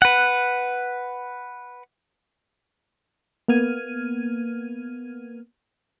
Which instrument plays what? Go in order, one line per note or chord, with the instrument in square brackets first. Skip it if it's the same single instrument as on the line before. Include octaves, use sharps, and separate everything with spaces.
[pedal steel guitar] B4 F#5
[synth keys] A#3 B3 F6 G#6 D#7